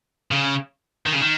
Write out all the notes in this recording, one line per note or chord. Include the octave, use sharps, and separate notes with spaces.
C#3
D#3
C#3
D#3